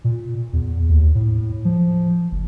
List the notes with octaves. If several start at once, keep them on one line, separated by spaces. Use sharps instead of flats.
A#2
E2
D#2
A2
F3
F#1